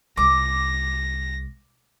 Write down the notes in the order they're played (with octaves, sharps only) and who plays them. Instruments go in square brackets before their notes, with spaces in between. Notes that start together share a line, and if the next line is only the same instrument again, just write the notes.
[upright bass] C2 [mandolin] D6 [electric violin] A#6